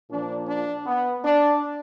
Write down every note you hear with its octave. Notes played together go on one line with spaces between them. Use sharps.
A#2 F3 D4
D4
B3
D4